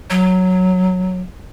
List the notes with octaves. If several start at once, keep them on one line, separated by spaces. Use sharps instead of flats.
F#3